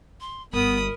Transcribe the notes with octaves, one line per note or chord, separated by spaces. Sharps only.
C6
G1 B3 A#4 B5 D#6